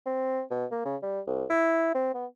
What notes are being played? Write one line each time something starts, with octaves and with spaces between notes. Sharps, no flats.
C4
B2
A#3
C#3
G3
C2
E4
C4
B3